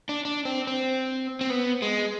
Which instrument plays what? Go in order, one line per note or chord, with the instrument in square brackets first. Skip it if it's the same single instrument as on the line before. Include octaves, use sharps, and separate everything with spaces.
[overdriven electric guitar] D4
D4
C4
C4
C4
B3
G#3